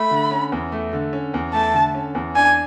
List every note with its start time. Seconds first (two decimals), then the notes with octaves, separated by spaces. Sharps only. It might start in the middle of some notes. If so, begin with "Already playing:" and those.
Already playing: A3 B5
0.11 D3
0.31 C#4
0.52 E2
0.72 A3
0.93 D3
1.13 C#4
1.34 E2
1.54 A3 A5
1.74 D3
1.95 C#4
2.15 E2
2.35 D4 G#5